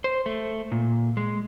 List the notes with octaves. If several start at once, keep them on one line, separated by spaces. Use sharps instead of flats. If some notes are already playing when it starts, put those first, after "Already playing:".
C5
A3
A#2
G#3